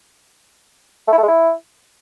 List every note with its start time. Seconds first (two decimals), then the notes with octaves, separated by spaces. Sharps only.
1.08 A3
1.13 E4
1.18 A3
1.23 G#3
1.28 E4